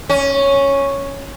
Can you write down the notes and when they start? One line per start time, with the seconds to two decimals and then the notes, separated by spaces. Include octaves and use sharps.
0.09 C#4